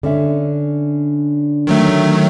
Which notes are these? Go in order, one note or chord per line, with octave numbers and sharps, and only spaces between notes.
D3 C#4 E5
D#3 F#3 A3